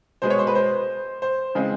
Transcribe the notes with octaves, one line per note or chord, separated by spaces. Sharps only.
B2 G#3 B3 C5
C#5
C5
B4
C5
C5
C#3 E3 G#3 C4